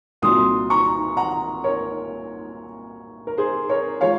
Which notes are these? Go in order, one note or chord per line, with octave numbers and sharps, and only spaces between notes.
C2 A#2 F#3 C6 D#6
A#5 C#6
F#5 A#5
A#4 C#5
A#4
G#4 C5
A#4 C#5
F3 G#3 C#5 F5